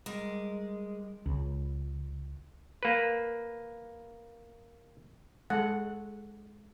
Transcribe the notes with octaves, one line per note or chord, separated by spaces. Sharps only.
G3 G#3 A#4
C#2
A#3 B4
G#3 A4 F#5